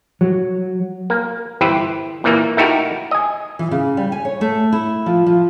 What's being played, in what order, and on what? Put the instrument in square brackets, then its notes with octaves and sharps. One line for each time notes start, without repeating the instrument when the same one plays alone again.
[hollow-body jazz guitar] F#3
[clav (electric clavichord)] A#3
G1 E3 G4 B4 C5
A#2 E3 A#3
A3 D#4 E4 F#4 G4 A#4
D#5 G#5
[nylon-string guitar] E3
C#3
G3
G#5
C#5
A3
E4
F3
F3